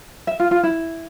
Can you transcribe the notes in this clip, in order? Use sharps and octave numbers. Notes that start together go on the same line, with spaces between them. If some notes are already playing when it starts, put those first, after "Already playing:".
E5
F4
F4
E4